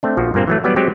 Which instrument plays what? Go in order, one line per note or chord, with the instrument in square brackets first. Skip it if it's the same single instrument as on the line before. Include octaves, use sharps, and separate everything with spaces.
[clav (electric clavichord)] A3 C4 D4
A#1 F3 F#4
G2 A#2 A#3 C4
E3 F#3 A3
F#3 G3 B3 B4 D5
F#3 G#3 C4 G4